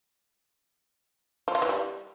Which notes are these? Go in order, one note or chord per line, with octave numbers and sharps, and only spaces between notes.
F3
F4
E3
G3